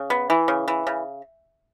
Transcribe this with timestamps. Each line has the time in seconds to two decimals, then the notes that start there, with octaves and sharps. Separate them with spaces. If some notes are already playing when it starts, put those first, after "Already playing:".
Already playing: C#3
0.10 B3
0.30 E3
0.48 C#3
0.68 E3
0.87 C#3